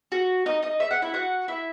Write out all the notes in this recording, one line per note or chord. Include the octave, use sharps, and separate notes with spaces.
F#4
D#4 D#5
D#4 D#5
E5
F#5
E4 E5
F#4 F#5
E4 E5